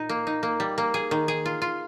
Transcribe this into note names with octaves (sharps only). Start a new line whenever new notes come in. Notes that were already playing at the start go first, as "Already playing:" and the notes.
Already playing: A#2 D#4
A#3
D#4
A#3
G3
A#3
G#4
D#3
G#4
F4
F4